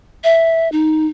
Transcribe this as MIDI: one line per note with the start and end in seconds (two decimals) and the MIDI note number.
0.24 0.70 76
0.72 1.07 63